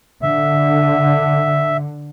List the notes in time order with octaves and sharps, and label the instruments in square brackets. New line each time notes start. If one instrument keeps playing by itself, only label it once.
[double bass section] D3 [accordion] E5